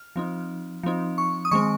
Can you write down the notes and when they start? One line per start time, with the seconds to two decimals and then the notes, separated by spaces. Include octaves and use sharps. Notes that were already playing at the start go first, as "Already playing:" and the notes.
Already playing: F6
0.16 F3 C4 D#4
0.83 F3 C4 D#4
1.18 C#6
1.45 D#6
1.51 D#3 G#3 C4 C#6